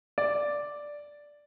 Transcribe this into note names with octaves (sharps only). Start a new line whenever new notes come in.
D5